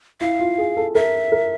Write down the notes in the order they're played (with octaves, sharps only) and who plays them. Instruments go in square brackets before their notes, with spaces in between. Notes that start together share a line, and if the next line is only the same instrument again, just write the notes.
[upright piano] E4 [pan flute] F5
[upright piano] F4
G#4
A4
[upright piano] A#4 [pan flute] E5
[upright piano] A#4